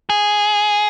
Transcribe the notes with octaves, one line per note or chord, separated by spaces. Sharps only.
G#4